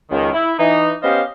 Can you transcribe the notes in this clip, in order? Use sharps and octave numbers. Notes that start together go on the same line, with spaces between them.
C#2 D#3
E4
E3 D#4
B3 C#4 G4 C5 D#5 F5